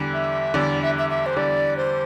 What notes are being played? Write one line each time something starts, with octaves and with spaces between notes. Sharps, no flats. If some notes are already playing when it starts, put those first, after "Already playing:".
Already playing: E2 D3 G3
E5
E2 D3 G3 D5
E5
E5
E5
C5
E2 D3 G3 D5
C5